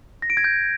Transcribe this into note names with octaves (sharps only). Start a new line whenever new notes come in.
A#6
D7
G#6
G6